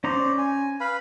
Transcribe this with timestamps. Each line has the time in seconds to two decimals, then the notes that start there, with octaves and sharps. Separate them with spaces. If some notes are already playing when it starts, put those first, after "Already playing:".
0.04 C#4 C5 D5 A#5
0.38 G#5
0.80 B4 F5 B5